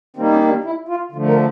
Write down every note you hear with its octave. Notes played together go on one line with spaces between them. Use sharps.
D#3 G3 A#3 C4
C#4
D4
E4
F4
D3 F3 A3 F4
A#4